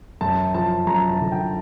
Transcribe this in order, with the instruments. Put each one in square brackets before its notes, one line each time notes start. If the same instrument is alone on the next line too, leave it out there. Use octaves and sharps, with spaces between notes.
[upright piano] F#2 A5
F3 A5
F#2 A#5
A5
D3
G5